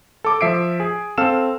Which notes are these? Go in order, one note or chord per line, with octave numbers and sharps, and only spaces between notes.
A4 D6
F3 E5 C7 D7
G#4
C4 A4 F5 E6 F6 E7